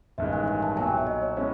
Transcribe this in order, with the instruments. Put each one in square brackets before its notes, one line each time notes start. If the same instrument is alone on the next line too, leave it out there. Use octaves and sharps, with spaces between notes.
[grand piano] A1 G2 D#3 G#3 [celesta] E5
[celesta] G#5
G#5
A5
[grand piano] B1 A#2 F#3 [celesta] G#5
[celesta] G5
E5
D#5
C#5
[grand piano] B2 G#3 C#4 E4 [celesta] C5